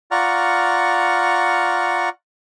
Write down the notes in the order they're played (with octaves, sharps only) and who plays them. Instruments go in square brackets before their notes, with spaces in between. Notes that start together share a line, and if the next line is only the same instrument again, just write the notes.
[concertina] F4 D5 F#5 A#5 C#6 F6